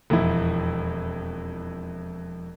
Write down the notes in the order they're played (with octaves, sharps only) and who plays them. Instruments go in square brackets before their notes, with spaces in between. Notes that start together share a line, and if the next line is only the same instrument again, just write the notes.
[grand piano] E1 F2 E4